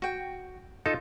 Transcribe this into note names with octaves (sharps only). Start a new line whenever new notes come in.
F#4 G5
D#4 F4 A4